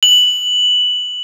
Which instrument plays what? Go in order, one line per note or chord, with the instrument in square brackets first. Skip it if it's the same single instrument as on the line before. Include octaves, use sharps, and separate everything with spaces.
[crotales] F#7